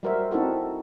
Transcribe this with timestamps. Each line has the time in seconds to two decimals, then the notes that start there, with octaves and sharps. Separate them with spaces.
0.03 G3 F#4 A#4 C5 E5
0.31 C4 D#4 E4 F#4 A4